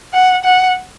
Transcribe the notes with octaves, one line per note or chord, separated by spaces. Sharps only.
F#5
F#5